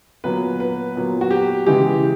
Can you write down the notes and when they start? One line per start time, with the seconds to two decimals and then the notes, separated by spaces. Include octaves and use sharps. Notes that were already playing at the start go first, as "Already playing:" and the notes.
0.24 A#2 F#3 B3 B4
0.60 B4
0.96 A#2 F#3 B3
1.21 F#4
1.31 G4
1.66 C#3 E3 G#3 G4